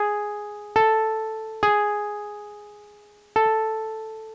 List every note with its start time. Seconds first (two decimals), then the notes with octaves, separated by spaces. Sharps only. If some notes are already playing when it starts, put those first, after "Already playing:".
Already playing: G#4
0.76 A4
1.63 G#4
3.36 A4